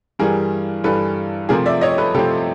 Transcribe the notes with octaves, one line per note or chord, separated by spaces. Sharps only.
G2 E3 G3 G#4 A#4
G2 E3 G3 A4 B4
C3 F3 A3 C4 G#4 A#4
D5 E5
C#5 D#5
A4 B4
C3 F3 A3 C4 G4 A4